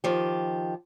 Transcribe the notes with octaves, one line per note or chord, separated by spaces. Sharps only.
D#3 F3 G4